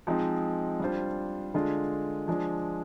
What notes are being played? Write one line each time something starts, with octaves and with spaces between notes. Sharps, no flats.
F3 G#3 C4 D#4
G3 D4 F4 C5
D3 G#3 D4 F4
F3 G#3 D4